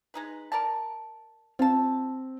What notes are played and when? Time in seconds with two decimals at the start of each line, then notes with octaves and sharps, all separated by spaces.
0.14 G#3 D#4 B4
0.52 A#4 D5 A5
1.59 C4 F4 A5